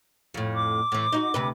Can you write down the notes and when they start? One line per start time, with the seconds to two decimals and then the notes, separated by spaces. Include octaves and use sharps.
0.34 F2 A2
0.54 D6
0.92 A2 E3
1.12 D#4 E4 F#4
1.34 D2 C3 B4